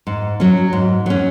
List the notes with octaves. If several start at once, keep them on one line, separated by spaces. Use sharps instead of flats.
G#2
F#3 C#4
G#2
F#3 C#4